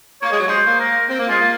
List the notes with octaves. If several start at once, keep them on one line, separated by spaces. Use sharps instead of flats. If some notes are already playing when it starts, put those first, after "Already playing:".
A#3 C#5
G#3
F#3
C#5
G#3 C5
A#3
A#4
C4
A#3
G#3 F4
A#3